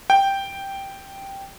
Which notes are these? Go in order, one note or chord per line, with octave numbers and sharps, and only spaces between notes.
G5